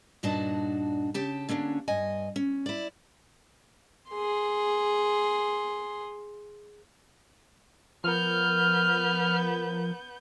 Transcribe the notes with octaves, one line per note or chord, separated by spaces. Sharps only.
G2 A#2 D4 D#4 F#4 A5
C#3 G4 A5
D3 A#3 C#4 D4
G2 D#5 G#5
C#4
E4 D5
G#4 C6
F3 B3 A#4 F6 G6